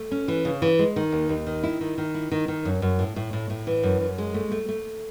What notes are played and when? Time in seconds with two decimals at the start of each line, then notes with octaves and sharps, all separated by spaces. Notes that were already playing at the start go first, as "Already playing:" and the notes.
Already playing: A3
0.11 C#4
0.28 E3
0.45 C#3
0.62 E3
0.79 G#3
0.96 D#3
1.12 D#2
1.29 D#2
1.46 D#3
1.63 E4
1.81 D#3
1.98 D#3
2.15 E4
2.32 D#3
2.48 D#3
2.65 F#2
2.82 F#2
2.99 A2
3.16 A2
3.33 A2
3.50 A2
3.67 E3
3.83 F#2
4.00 F#2
4.18 G#3
4.34 A3
4.52 A3
4.68 A3